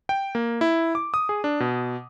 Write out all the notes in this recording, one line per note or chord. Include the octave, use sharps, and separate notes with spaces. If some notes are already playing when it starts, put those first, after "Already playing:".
G5
A#3
E4
D6
D#6
G#4
D4
B2